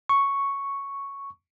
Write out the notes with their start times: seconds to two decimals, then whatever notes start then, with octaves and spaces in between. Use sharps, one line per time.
0.09 C#6